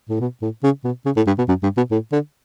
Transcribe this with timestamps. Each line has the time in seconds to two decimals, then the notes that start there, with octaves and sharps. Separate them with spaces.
0.09 A2
0.21 B2
0.42 A2
0.63 C#3
0.84 B2
1.06 C#3
1.17 A2
1.27 G2
1.38 B2
1.48 F#2
1.63 G2
1.77 B2
1.91 A2
2.12 D3